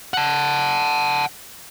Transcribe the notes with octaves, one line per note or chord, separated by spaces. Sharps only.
F#5 A5